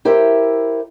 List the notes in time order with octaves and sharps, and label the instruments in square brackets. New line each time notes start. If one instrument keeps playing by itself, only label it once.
[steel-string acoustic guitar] E4 G4 A#4 C5 E5